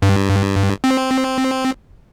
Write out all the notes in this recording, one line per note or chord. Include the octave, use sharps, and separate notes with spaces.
G2
C4